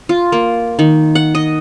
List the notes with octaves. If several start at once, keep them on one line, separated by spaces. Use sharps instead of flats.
F4
A#3
D#3
F#5
D#5